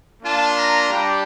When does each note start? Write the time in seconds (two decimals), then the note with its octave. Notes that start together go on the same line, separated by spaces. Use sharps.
0.22 A#3 D4 F4 A5
0.56 A#5
0.89 G3 D4 G4